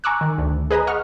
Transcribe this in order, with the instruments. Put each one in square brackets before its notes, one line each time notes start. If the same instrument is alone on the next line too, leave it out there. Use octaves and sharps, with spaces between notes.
[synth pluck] G#5 A#5 C#6 D6 E6 F#6
D#3
D2
G#4 B4 D#5 A#5 D#6
D#5 F#5 C#6 F6